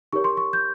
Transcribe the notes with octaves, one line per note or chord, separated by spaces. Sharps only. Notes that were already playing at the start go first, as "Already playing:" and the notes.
D#4 G4 A#4 C#5 C#6
C6
C#6
G6